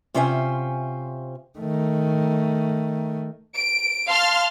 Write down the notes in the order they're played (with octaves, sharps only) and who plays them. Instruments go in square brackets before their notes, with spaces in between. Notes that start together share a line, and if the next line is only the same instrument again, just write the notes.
[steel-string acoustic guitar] C3 C#4 F4 C5 E5 G#5
[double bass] D#3 A3
[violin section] D7
F5 A5 C6 F6